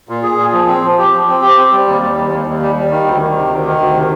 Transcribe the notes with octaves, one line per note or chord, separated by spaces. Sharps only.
A#2
G#4
A#2
F3
C4
F3
G4
F3
C4
G4
C4
G3
D#2
G3
D#2
D#2
D#2
G3
G3
D#3
D2
D#3
C3
D2
D#3
D2
C3